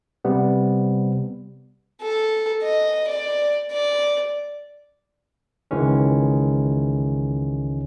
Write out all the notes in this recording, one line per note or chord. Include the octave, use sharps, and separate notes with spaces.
C3 G3 B3
A4
D#5
D5
D5
C#2 D#3 E3 G#3 C#4